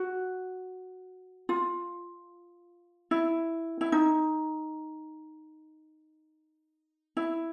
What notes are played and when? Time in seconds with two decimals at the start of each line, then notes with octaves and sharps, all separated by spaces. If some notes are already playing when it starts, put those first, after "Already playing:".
Already playing: F#4
1.49 F4
3.11 E4
3.81 E4
3.92 D#4
7.17 E4